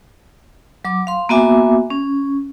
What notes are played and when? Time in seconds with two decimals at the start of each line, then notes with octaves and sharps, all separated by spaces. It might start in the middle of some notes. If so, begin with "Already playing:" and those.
0.85 F#3 D6
1.07 F5 C6
1.29 A#3 B3 F#4 E5 G#5 D6
1.90 C#4